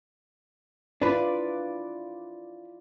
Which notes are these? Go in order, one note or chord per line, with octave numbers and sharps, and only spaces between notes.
D4 E4 F4 B4 D5